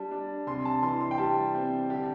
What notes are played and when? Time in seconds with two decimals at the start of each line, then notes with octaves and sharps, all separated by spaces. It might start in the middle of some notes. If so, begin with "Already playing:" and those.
Already playing: G3 D4 A5
0.11 D4
0.47 C3 C6
0.65 A5
0.82 E3 C6
1.00 C6
1.11 G5
1.18 G3 A5
1.55 C4
1.89 D3 G4